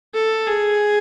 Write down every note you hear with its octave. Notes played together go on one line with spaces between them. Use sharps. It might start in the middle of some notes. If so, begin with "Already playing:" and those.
A4
G#4